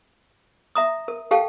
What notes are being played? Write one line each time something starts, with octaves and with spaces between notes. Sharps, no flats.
E5 A#5 D#6
A#4
G4 A4 F5 G5 A5